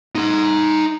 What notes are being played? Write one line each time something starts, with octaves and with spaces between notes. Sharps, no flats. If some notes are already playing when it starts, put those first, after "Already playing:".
D#4 C6